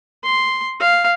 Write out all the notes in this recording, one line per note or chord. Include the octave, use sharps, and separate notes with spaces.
C6
F5